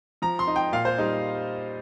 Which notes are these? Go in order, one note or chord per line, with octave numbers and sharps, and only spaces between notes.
F3 A#5
C6
D#4
G5
A#2 F5
C5
G3 D#4